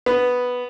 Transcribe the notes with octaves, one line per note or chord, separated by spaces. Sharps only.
B3